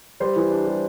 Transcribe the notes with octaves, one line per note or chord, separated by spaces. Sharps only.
G3 C5
E3
D4
G3